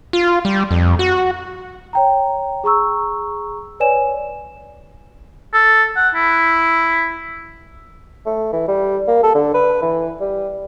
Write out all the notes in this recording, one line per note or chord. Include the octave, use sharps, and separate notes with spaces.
F4
G3
F2
F#4
C#5 G5 A#5
G#4 A#5 C#6 E6
B4 C#5 D5 G#5 E7
A4
F#5
E4
A3
E3
G3
A#3
A4
D3
B4
E3
G3